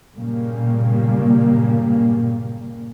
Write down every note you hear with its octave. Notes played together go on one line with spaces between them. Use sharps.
G1 A#2 C#3 G3 A#3